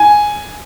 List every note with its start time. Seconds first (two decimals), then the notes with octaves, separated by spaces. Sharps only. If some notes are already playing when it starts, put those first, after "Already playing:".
Already playing: G#5